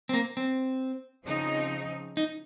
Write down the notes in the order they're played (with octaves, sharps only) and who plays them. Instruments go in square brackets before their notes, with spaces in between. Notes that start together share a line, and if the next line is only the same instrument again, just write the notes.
[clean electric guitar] C4
A#3
C4
[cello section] C#3 F3 C4 D#4
[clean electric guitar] D#4